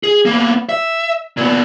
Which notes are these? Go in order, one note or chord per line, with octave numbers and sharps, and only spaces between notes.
G#4
A#3 B3
E5
A#2 B3